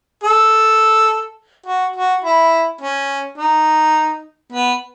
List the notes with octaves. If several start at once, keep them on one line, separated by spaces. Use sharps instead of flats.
A4
F#4
F#4
E4
C#4
D#4
B3